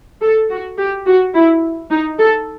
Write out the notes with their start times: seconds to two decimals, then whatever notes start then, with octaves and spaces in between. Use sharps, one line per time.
0.21 A4
0.50 F#4
0.78 G4
1.07 F#4
1.34 E4
1.90 D#4
2.19 A4